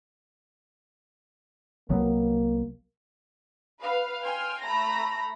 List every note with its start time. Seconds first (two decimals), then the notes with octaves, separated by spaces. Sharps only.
1.89 C2 F#3 A#3 B3
3.80 B4 F5
4.23 G5 G#5 C6 F6
4.61 A3 A#5 B5 A#6